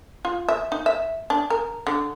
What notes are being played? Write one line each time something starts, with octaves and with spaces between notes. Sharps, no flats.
F4
E5
D#4
E5
D4
A#4
D3